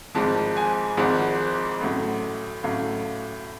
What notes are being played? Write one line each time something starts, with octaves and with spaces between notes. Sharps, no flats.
G#1 G#2 F3 A5
G#5
G#1 G#2 F3 F#5
A1 A2 F#3
A1 A2 F#3 F5